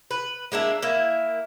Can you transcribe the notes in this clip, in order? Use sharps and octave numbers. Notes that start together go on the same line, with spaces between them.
B4
G#3 A#3 D4 E4
A#3 E4